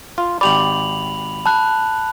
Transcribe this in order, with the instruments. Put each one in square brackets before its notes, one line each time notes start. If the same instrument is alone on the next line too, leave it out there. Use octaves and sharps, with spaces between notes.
[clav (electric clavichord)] F4
[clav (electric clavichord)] G#1 G4 D5 [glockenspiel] B5 F7 F#7
[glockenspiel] A5 B5 F#6